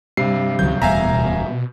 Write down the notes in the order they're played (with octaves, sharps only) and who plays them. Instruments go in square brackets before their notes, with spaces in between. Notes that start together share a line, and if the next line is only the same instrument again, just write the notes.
[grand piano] G2 C3 [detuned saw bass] G3 [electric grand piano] C7
[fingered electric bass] C#2 D3 E3 [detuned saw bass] F#3 [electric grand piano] G6
[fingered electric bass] D1 E2 G3 [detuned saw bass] B2 [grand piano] E5 [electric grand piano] F5 G#5 A#5